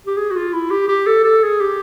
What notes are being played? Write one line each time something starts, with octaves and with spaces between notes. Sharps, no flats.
G4
G#4
F#4
F4
E4
G4
G4
A4
A4
G#4
G4